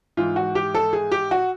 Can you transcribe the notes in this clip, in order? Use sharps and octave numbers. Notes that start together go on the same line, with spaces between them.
G#2 E3 F4
F#4
G4
A4
G#4
G4
F#4